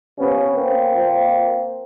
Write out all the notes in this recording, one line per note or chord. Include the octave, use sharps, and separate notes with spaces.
C3 F3 B3 C#4
A#3 C4
A#2 F3